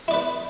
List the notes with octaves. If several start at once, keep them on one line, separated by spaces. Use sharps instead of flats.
E4 B4 D5